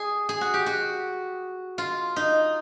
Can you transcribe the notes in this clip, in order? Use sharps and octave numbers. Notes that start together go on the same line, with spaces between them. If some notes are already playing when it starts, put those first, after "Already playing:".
Already playing: G#4
G#4
F#4
G4
F#4
F4
D#4